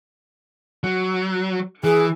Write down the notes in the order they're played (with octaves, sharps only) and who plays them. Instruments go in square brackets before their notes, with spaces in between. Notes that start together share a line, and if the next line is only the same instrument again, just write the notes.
[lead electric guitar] F#3
[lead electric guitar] E3 [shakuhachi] G#4